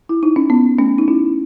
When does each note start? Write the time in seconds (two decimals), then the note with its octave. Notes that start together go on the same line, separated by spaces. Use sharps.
0.09 E4
0.23 D#4
0.36 C#4
0.50 B3
0.79 A3 C#4
0.98 D#4
1.08 C#4 E4